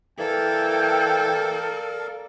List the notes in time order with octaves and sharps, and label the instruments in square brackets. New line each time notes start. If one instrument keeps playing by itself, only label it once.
[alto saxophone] E3 [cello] A4 [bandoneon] A#4 D5 F5 [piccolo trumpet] G5